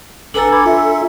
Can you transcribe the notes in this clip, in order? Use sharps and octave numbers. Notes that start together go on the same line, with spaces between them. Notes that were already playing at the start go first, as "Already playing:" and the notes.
G#1 D4 A4 B4 G#5 A#5 A6
B5 D6 G#6
F4 E5